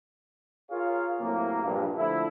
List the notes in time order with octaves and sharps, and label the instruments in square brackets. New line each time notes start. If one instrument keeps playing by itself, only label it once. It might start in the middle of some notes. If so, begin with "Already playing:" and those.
[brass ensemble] F4 G#4 A#4 C#5 F5
A2 C3 F#3 A#3
A#1 G2
D3 F3 A3 E4